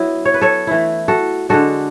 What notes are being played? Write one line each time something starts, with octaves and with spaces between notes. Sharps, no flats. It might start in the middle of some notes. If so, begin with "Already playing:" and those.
Already playing: F#3 B3 E4
C#5
B4
A4 C#5
E3 A3 E4
F#4 A4
D3 G#3 D4 F#4 A4